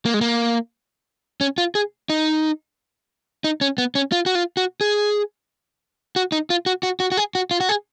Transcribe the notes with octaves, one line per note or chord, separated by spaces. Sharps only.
A#3
G#3
A#3
C#4
F4
G#4
D#4
D#4
C#4
B3
C#4
F4
F#4
F4
F#4
G#4
F#4
D#4
F4
F#4
F#4
F#4
F#4
G#4
F#4
F4
F#4
G#4